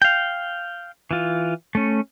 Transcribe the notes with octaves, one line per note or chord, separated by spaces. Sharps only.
F5 G5
E3 F4
A3 C#4